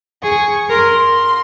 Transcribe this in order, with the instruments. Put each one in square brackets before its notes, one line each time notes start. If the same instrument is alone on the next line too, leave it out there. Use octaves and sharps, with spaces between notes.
[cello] G#4 [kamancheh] C#6
[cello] A#4 [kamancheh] C6